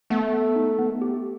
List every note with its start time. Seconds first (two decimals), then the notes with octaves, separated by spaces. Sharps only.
0.10 A3 B3
0.33 B3
0.56 D#4
0.79 B3
1.02 G4